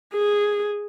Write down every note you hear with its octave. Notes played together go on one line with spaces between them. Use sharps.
G#4